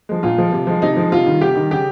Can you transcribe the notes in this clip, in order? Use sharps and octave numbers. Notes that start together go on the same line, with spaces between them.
F3 G#3
A#2 F4
F3 G#3
C3
F3 G#3
C3 D#4
F3 G#3
C3 F4
D#3 G3
C3 G4
D#3 G3
C#3 G4